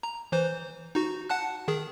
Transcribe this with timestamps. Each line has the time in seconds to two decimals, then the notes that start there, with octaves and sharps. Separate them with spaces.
0.03 A#5
0.32 E3 C5
0.95 D#4 F#4
1.29 F#5 A5 F#6
1.68 D#3 G#4